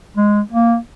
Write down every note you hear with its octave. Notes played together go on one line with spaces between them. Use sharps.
G#3
A#3